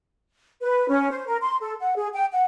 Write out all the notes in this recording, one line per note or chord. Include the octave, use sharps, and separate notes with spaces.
B4
C#4
C5
A#4
C6
A4
F#5
G#4
G5
F#5